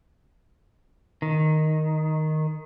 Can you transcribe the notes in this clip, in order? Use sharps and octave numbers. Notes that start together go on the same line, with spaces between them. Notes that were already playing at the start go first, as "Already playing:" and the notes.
D#3